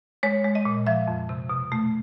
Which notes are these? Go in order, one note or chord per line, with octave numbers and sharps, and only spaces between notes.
G#3 C#5
G#3
D#5
A#2
F3 E5
F2
C3
B2
A3